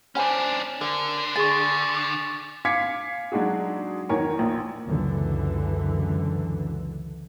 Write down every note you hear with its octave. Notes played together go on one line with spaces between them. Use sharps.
C#4 D4 C5 G#5 B5
D3 A#4 D5
G#4 D5 G#5 C#6 A6
F5 G#5 D6 G#6 B6 C#7
F#3 G#3 D4 D#4 F#4 G#4
E2 D#3 A#4 C#5 G#5
A#1 A#2
C#2 F#2 D3 E3